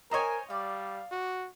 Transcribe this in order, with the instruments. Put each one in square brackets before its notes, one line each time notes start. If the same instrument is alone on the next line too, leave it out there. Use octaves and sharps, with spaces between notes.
[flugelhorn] A#4 [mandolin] C5 G#5 [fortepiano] C#5 D#5 A#5
[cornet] G3 [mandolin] D5 [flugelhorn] F5
[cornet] F#4